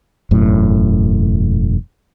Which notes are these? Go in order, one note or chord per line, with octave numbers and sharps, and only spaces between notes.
E1 F#2 A2